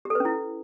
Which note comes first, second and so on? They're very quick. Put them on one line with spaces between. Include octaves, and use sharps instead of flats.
G4 A4 B4 C#4 E4